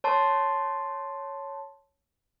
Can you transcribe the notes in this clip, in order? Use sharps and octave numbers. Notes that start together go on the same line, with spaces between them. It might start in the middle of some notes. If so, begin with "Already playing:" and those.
C#5 A5 C6